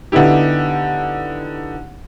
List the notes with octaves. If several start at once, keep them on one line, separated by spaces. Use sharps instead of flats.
D3 B3 D#4 E4 G4